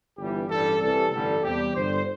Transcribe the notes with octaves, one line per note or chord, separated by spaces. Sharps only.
G1 G2 E3 G3 G4
A1 G2 G3 A4
C2 C3 E3 G3 A4
A1 G2 D3 G3 A4
E2 C3 G3 G4
G1 G2 D3 G3 C5